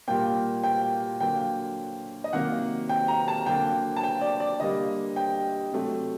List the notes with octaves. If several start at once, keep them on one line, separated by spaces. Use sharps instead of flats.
A#2 G3 A#3 G5
G5
D3 F#3 A#3 G5
D#5
C3 D#3 F#3 A#3 F#5
G5
A#5
A5
D3 F#3 A#3 G5
A5
G5
D5
D5
D3 G3 A#3 D#5
G5
C3 F#3 A3